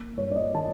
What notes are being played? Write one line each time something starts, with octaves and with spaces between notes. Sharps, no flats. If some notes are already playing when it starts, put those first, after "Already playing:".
Already playing: A#3
G2 C#5
D5
D#5
D#3 A5